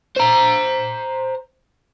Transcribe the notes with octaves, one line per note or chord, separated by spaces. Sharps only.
C5 A#5